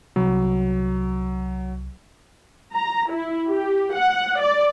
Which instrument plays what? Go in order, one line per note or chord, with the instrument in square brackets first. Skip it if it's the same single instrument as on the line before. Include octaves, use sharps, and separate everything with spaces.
[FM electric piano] C2 [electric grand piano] F#3
[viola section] A#5
E4
G4
F#5
D5